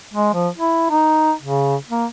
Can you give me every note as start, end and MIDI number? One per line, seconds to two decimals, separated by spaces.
0.13 0.33 56
0.34 0.48 53
0.57 0.86 64
0.90 1.32 63
1.41 1.76 49
1.89 2.06 58